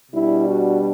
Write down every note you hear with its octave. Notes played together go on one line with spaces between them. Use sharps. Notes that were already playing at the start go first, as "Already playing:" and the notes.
B2 G3 D4 E4
F#4